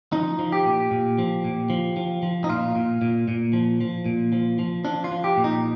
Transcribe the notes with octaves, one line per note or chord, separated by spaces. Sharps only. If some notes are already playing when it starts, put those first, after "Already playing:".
F3 D#4
F3
G4
A#2
A#2
F3
A#2
F3
F3
F3
D#4
A#2 F4
A#2
A#2
A#2
F3
F3
A#2
F3
F3
F3 D4
F4
F3
G4
A#2
D#4